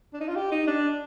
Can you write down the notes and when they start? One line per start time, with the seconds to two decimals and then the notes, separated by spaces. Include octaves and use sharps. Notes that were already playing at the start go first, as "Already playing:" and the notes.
0.13 D4
0.21 D#4
0.29 F4
0.36 G4
0.52 D#4
0.67 D4